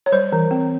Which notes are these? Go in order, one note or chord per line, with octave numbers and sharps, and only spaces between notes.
C#5
G3 C5
E3
C4